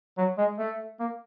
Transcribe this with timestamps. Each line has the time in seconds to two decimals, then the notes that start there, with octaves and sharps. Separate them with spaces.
0.18 F#3
0.38 G#3
0.58 A3
1.00 A#3